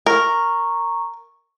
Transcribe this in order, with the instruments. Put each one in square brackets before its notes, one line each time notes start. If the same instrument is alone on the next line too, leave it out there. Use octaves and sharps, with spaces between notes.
[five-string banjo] A#4 [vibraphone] A#5 C#6